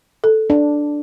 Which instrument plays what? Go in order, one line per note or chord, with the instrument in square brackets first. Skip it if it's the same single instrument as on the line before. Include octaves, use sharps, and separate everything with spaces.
[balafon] A4
[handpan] D4